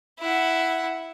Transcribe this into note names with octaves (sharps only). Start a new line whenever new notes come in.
E4 F#5